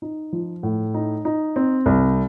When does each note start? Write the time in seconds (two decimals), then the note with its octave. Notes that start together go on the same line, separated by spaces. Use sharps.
0.02 D#4
0.33 F3
0.63 A2
0.94 D#4
1.25 D#4
1.56 C4
1.86 C2